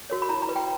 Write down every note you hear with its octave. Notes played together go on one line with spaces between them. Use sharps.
F#4 A#4 C#5
B5
E4 A#5
A#5
B4
G5